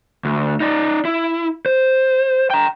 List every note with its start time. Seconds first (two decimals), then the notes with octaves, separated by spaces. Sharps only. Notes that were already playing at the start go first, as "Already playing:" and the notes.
0.25 D2
0.60 D#4 D5
1.05 E4
1.66 C5
2.50 G5 A#5